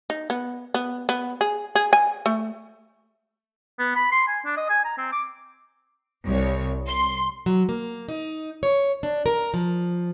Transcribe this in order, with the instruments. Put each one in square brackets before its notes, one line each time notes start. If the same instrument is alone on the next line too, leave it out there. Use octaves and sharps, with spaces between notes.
[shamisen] D#4
B3
B3
B3
G#4
G#4
G#5
A3
[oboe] B3
B5
C6
G#5
D4
D#5
G#5
A#5
C4
D6
[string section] C2 C#5
C6
[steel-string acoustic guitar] F#3
A#3
D#4
C#5
D4
A#4
F3